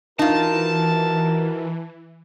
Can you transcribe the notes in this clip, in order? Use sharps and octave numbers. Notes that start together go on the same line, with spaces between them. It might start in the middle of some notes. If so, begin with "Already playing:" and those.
E3 D#4 F4 F#4 A#4 A5